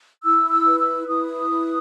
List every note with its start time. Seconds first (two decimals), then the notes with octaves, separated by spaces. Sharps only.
0.24 E4 E6
0.51 E6
0.66 B4
0.80 E6
1.08 E4 D#6
1.50 B4